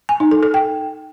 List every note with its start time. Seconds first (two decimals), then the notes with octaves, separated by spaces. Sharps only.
0.09 G#5
0.20 D#4
0.31 A4
0.43 A4
0.54 G5